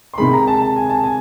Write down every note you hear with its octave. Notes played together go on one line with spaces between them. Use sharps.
C6
C3 D#3 G#3 B5
A#5
A5
A5
G#5
A5
G#5